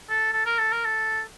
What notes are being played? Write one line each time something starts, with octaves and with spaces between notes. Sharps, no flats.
A4
A4
A#4
A4
A#4
A4